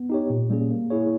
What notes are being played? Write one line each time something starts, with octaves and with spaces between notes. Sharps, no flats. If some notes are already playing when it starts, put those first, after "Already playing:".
Already playing: B3
D#4 G4 C#5
A#2
G3 A#3 C#4 G#4
A#3
E4 G#4 C#5